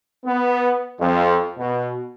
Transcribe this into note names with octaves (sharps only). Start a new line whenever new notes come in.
B3
F2
B2